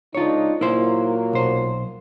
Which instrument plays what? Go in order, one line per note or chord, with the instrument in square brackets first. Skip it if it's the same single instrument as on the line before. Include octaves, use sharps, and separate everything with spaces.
[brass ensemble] C#2 D4 D#4 [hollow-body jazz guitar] F4 C#5
[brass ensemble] A#2 F#3 A#3 [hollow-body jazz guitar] E4 C5
[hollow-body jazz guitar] B1 C5